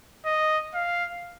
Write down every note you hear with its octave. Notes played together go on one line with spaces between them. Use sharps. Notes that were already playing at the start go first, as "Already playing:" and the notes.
D#5
F5